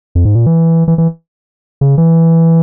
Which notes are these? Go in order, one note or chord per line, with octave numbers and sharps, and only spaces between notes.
F2
G#2
A#2
E3
E3
E3
C#3
E3